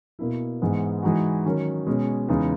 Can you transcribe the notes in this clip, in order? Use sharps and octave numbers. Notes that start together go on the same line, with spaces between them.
B2 A#3 E4
G#2 E3 G#3 B3
E3 G#3 D#4 F#4
D#3 F#3 C#4
B2 G#3 C#4
E2 C#3 E3 G#3 D#4